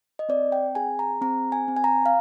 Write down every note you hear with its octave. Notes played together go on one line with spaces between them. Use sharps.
D#5
C4 D5
G5
G#4 G#5
A#5
C4 A#5
G#5
C4
G#5
A#5
F5